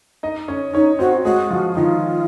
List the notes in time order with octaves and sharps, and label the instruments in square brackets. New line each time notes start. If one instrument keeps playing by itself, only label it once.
[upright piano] D#4 D#5
C#4 C#5
[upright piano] C#4 C#5 [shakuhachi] D#4
[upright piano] C4 C5 [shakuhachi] F#4
[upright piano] G#3 G#4 [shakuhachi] F#4
[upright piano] F3 F4
[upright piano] D#3 D#4 [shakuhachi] F4